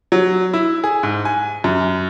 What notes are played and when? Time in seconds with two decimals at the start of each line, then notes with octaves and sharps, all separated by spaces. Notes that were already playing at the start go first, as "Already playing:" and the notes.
0.12 F#3
0.54 E4
0.84 G#4
1.03 G#2
1.25 G#5
1.64 F#2